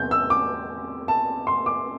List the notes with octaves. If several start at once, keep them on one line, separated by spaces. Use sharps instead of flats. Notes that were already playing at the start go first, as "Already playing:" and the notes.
Already playing: E2 C3 G3 G6
E6
D6
A5
C6
D6